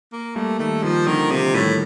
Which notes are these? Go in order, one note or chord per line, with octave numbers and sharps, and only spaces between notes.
A#3
G3 A3 A#3
D#3 G3 A3
D#3 F3 G3
D3 D#3 F3
C3
A2 D#3 G3